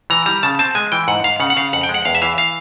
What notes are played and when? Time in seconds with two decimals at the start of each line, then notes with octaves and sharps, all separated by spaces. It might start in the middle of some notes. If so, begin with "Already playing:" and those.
0.10 E3 A#5
0.26 G3 A#5
0.43 C#3 A5
0.59 C4 A5
0.75 G#3 G#5
0.92 E3 G5
1.08 G#2 F#5
1.24 G#2 F5
1.40 C#3 F#5
1.50 F#5
1.57 C#3 F5
1.73 F2 F#5
1.83 G5
1.89 G#3
1.94 F#5
2.05 E2 F5
2.15 E5
2.22 E3 F5
2.38 F5